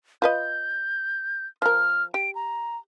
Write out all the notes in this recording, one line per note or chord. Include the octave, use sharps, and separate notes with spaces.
F4 B4 D#5 G6
F3 A#4 F6
G4 D7
A#5